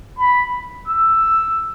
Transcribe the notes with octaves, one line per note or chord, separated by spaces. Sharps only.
B5
E6